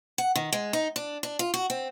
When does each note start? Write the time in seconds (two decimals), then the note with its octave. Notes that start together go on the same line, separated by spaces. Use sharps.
0.18 F#5
0.35 D#3
0.53 G#3
0.73 D#4
0.96 D4
1.23 D4
1.39 F4
1.54 F#4
1.70 C4